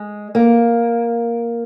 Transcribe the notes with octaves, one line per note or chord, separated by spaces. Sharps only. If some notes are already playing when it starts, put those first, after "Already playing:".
Already playing: G#3
A#3